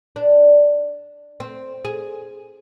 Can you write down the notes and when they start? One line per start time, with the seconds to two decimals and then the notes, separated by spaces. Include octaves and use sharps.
0.16 D4
1.40 C4
1.85 G#4